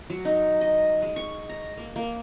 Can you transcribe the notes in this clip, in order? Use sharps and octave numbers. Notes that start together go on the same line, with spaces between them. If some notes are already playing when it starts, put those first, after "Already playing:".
F#3
D#4
D#5
G#3
C#6
A#5
A#3
A#3